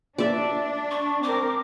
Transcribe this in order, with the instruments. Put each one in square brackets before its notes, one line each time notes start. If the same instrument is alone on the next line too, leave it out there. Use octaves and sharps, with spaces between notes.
[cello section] D4 [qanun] D5 E5
[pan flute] C#6
[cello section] C4 A#4 [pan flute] D6